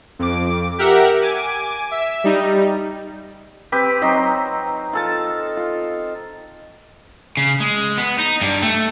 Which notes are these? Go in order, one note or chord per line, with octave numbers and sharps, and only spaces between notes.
F2 D6
G4 A#4 E5 F#5
G#5 D6
E5
G3 D#4
C4 G4 B4
F#3 C4 D#4 C5
F4 A4 A5
F4
C#3
G#3
B3
D#4
G2
A3